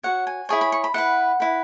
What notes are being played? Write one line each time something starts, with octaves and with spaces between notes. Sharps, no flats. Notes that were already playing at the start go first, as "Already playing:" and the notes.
F#4 C#5 F#5
G#5
E4 G#4 C#5 G#5
B5
C#6
B5
E4 B4 F#5
E4 B4